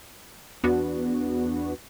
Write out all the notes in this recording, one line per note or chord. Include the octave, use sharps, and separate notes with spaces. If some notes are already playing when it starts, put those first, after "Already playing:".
E2 B3 D4 F#4